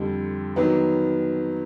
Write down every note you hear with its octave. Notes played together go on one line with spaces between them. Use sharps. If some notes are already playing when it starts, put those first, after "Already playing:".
Already playing: F2 D3 G3
D#3 F#3 B3